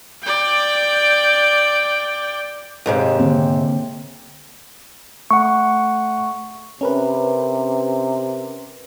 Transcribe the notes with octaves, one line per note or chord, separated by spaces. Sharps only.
D5 G5
D#2 G#2 C3
D3 A#3 C4
A3 F#5 C#6
C3 C#4 A#4 B4